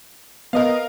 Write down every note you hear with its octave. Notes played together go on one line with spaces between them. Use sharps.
B3 A#4 D#5 F5